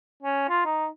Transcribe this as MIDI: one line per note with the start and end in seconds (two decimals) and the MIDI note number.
0.23 0.45 61
0.49 0.63 65
0.65 0.87 63